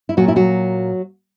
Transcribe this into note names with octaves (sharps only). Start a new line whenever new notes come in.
E4
A#2 F#3 F#4
E4
F#3 F#4